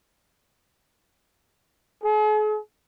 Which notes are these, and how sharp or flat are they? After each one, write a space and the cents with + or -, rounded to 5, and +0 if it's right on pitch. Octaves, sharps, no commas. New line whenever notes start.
G#4 +45